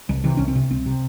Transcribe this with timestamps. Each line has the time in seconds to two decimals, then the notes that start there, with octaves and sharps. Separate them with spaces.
0.09 C2
0.24 C3 E3
0.37 C2 C#4
0.48 C4
0.56 C3
0.71 C2 C4
0.86 C3